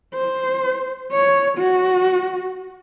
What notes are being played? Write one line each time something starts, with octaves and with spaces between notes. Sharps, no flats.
C5
C#5
F#4